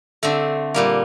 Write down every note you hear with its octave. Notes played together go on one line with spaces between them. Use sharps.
D3 A3 C4
A#2 G3 A#3